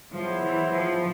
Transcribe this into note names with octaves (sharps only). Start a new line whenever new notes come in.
F3 F#3 B3 E4 G#4 C5
E3
F3